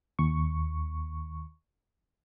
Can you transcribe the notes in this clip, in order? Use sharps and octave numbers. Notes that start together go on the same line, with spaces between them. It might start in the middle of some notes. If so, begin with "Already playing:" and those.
D#2 C#6